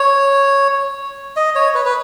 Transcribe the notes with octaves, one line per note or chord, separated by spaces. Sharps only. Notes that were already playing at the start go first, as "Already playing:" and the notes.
Already playing: C#5
D#5
C#5
B4
B4